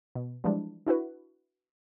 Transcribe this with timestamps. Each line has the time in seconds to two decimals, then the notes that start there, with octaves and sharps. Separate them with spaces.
0.15 B2
0.44 E3 F3 G3 G#3 D4 E4
0.87 D4 E4 F#4 B4